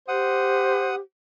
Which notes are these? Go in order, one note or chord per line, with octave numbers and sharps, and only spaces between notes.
G4 C5 F#5 D#6